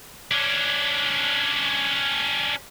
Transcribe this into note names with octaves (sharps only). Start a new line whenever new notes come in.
C#4 D4